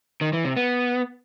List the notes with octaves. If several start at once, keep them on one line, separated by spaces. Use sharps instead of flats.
D#3
E3
C3
B3